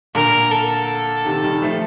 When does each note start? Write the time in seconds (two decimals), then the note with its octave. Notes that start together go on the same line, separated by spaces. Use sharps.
0.15 A#2 D3 A#4
0.51 A4
1.25 C3 D#3
1.43 D#3 G3
1.62 F3 A3